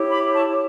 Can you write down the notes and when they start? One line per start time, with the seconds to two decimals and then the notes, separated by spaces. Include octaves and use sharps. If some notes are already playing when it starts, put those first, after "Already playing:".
Already playing: E4 G4 C#5
0.11 B5 D6
0.33 A5 C#6